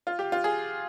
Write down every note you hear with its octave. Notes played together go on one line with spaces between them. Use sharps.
F4
G4
F4
G#4